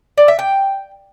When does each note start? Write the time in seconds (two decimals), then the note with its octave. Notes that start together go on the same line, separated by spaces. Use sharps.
0.18 D5
0.28 E5
0.39 G5